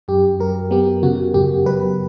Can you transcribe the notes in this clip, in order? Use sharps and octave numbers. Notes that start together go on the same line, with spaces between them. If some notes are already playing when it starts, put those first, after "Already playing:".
F#2 G4
F#3 A#4
B3 G4
C#3 F#4
F#2 G4
F#3 B4